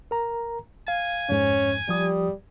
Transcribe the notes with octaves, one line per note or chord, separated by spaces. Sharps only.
A#4 A#5
F5 G#5
F2 G#2 C#4
F3 G3 G4 D#6